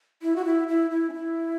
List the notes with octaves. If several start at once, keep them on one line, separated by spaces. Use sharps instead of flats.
E4
F#4
E4
E4
E4
C#4
E4